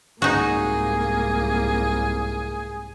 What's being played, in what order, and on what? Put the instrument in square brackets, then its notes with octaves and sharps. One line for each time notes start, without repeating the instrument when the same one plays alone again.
[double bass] C2 G#2 [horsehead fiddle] A#3 [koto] D#4 F#4 [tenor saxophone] G#4